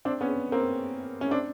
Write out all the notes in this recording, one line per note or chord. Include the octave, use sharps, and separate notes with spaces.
C4 D4
B3 C#4
A#3 C4
C#4
C4 D4